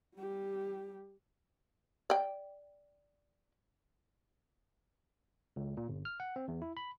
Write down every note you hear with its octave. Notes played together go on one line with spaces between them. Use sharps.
G3 G4
D5 G5
C#2
A#2
G1
F6
F#5
C4
E2
E4
B5